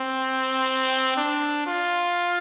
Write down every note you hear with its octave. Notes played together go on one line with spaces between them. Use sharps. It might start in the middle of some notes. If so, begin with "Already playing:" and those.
Already playing: C4
D4
F4